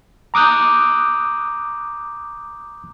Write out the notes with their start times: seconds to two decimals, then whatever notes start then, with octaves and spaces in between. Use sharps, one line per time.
0.34 A#5 D6 D#6 F#6 G6